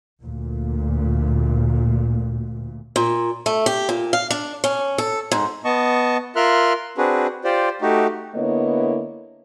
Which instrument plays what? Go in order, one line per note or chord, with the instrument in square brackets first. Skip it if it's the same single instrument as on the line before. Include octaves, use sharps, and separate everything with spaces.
[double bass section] D2 A#2
[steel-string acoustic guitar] A#2
A3
G4
A#2
F5
D4
C#4
A4
G#2
[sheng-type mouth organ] B3 D#5 A5 C#6
F4 A#4 E5 C6 F6 F#6
C4 D4 F#4 G#4 B4
F4 G4 C5 D5
A3 D#4 F#4 G4
[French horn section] D3 A#3 B3 E4 C#5 D#5